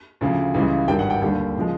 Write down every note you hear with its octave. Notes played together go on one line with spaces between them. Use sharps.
D2 C#3 F3
C#2 C#3 E3 G3
G#1 G2 D#3 G3 G5
F#5
G5
D#2 D3 G3 G5
C#3 F3 G#3